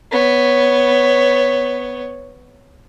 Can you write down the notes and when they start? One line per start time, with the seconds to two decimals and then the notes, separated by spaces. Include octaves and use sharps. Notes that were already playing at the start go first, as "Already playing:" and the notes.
0.12 B3 C#5